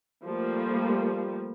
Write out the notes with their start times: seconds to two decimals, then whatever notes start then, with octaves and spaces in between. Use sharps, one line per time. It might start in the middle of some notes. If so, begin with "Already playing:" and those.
0.24 F3 G3 A3 A#3